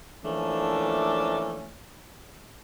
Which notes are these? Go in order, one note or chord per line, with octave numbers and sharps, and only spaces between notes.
E3 F3 A3 A#3 C#4 D4